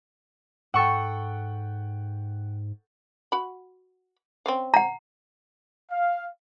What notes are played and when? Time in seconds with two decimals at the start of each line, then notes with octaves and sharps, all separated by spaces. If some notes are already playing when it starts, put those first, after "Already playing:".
0.74 G#2 A4 F#5 G5 C#6 E6
3.32 F#4 B5
4.46 C4 C#4 F5
4.74 F#5 A#5
5.91 F5